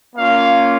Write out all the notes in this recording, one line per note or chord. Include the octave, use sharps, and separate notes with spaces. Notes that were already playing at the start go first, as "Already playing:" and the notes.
A#3 C#4 F4 F5